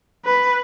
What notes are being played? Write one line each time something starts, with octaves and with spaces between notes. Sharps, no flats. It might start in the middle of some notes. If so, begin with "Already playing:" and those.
B4